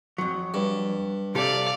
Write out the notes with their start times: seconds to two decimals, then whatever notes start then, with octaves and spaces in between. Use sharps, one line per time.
0.18 F2 F#3
0.54 G2
1.35 C3 G4 A4 D5 F5